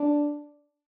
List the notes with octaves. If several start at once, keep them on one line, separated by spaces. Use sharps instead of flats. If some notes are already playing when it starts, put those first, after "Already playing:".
Already playing: D4